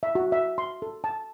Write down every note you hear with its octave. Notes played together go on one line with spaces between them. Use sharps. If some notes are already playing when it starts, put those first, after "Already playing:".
E5
F#4
E5
C6
A4
A5